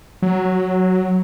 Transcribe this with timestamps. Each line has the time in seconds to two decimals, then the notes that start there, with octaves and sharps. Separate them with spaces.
0.22 F#3